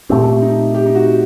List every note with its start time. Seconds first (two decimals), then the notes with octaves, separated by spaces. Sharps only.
0.09 A#2 A3 C4 G4
0.42 D#4
0.74 G4
0.86 D#4
0.95 F#4